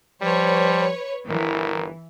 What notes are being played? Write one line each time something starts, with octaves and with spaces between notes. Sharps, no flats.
F3 G3 B4 C#5
G1 E3 A#4